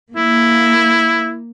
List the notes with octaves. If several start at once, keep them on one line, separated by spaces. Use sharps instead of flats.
A#3 E4